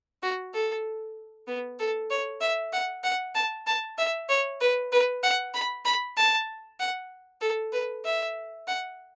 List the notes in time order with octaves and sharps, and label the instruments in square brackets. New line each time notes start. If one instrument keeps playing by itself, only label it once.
[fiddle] F#4
A4
B3
A4
C#5
E5
F#5
F#5
A5
A5
E5
C#5
B4
B4
F#5
B5
B5
A5
F#5
A4
B4
E5
F#5